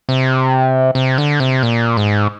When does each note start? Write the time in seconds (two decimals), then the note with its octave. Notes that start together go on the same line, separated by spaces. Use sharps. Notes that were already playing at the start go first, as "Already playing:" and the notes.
0.09 C3
0.95 C3
1.18 D3
1.40 C3
1.63 A#2
1.97 G#2